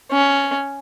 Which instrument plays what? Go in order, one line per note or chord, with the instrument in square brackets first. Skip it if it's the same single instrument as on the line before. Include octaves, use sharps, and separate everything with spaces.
[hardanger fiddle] C#4